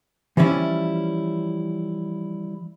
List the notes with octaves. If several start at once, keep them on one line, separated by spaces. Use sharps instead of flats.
E3 F3 G3 C#4 E4